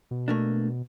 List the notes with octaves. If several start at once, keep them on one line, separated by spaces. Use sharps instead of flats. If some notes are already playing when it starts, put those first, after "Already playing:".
B2
A3 A#3 D4